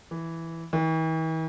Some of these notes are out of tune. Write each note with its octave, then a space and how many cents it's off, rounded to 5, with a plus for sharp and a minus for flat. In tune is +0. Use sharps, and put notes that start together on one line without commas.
E3 +0
E3 -45